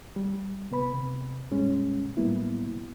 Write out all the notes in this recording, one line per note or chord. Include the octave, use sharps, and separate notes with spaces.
G3
C3 B3 B4 B5
C3
F2 A#2 G3 G#3 C#4
A2 F#3 G3 A#3 B3 E4